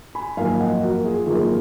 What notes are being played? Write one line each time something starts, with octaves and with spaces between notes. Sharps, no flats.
G#5 B5
G#1 F#2 F3 A#3 F5 G#5
D#5 F#5
F#4 A#4
F4 G#4
G#1 F#2 F3 A#3 F4 G#4